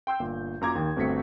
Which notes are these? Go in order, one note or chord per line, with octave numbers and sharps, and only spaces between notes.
G5 C6 E6 G6
G1 A#2
F#2 A#2 A#5 D6 G#6
D#2 D#3
G1 B2 A3 C4 B6 C#7